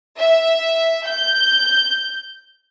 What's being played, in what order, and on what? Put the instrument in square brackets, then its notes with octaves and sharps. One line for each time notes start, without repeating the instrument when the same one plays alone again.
[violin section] E5
G6